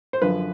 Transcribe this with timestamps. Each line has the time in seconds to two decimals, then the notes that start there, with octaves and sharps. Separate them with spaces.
0.13 C5
0.22 F#2 D3 F3 B4